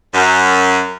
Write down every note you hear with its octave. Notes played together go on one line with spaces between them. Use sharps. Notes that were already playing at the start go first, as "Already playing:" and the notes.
F#2